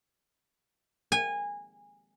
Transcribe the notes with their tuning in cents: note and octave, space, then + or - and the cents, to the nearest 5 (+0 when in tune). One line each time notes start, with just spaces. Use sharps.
G#5 -20